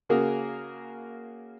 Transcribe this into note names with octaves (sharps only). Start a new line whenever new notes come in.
C#3 A#3 F#4 G#4 A#4